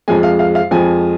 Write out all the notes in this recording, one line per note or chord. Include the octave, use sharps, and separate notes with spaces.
F2 F3 G#3 G#5
F5
F5
F5
F2 F3 G#3 G#5